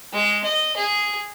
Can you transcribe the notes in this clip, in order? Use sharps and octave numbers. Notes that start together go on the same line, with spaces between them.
G#3
D#5
G#4